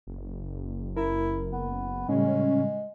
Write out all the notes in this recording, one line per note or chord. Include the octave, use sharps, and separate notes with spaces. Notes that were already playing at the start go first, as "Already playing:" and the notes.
F#1
E4 A#4
B3
A2 C#3 G3 G#3 C#4